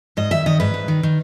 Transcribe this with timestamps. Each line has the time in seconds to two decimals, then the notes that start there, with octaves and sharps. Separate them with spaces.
0.17 G#2 D#5
0.31 D#3 E5
0.46 D#3 D#5
0.60 G#2 B4
0.74 G#2
0.88 D#3
1.03 D#3